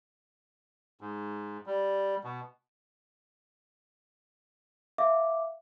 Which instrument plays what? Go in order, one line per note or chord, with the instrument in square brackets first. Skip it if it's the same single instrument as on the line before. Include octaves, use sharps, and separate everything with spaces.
[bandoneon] G#2
G3
B2
[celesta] E5 F5 D6